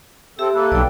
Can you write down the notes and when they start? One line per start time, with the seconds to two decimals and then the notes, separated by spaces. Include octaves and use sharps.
0.39 C4 G4 A4 E5
0.54 A#3 A4 B4
0.72 B1 D5 G5